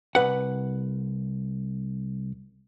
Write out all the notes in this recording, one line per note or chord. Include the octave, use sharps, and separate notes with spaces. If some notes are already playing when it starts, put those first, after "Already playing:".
C2 F#2 B4 F#5